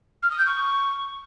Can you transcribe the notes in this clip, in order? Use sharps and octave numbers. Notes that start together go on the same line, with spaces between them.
F6
D#6
G6
C#6